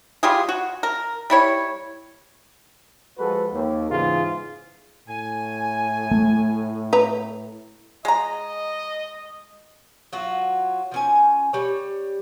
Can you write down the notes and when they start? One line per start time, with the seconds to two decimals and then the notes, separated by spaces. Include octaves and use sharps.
0.23 G3 F4 G4 G#4
0.49 F#4
0.83 A#4
1.30 G3 E4 C#5
3.18 F3 G#3 F#4 A4 B4
3.52 D#2
3.90 E2 G#2 C#3 E3 F4 G#4
5.08 A2 G#5
6.11 A3
6.93 B4 A#5
8.05 G#3 D#5 A#5
10.13 F#3 F4 F#4
10.92 F3 C#4 G#5
11.53 G3 C#5